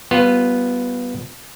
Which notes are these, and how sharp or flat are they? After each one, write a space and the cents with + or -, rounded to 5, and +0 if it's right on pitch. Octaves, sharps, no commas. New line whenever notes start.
G3 -15 B3 +0 F4 +10